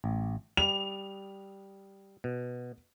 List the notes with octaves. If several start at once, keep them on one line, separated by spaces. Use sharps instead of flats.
A1
G3 F7
B2